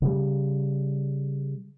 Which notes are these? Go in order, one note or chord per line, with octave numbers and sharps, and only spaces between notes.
C#3 G3